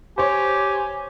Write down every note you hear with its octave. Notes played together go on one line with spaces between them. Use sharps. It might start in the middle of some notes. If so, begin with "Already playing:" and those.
G4 C5 C#5 G#5